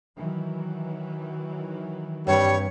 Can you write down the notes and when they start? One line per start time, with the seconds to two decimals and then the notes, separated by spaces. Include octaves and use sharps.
0.18 D#3 E3 F#3
2.27 G2 G3 C4 B4 C#5